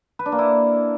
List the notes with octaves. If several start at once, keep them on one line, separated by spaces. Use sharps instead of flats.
B4
D4
A#3
E4